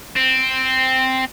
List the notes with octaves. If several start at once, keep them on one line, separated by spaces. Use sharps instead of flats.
C4